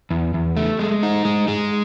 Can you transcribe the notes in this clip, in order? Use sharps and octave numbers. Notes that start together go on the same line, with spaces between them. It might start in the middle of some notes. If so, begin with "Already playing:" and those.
E2
E2
A3
G#3
D#4
G#3
G#3